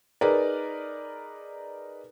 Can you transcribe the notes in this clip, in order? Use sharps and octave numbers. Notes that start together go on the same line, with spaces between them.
D#4 G#4 A#4 B4 D5